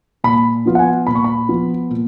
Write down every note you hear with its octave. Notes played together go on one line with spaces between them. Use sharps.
A#2 B5
F3 B3 F4
F#5
G#5
A#2 B5
C#6
B5
F3 B3 F4
A#2